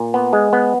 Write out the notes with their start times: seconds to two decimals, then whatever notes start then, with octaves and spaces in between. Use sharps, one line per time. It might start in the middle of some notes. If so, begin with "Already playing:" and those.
Already playing: A#2
0.14 B3
0.33 G#3
0.53 B3